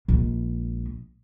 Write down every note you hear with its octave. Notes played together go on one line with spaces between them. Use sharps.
A#1 G#3